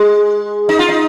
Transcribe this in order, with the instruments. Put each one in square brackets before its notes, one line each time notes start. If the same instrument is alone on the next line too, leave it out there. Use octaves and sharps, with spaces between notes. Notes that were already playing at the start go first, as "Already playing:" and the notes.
Already playing: [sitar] G#3
D#4
F4
D#4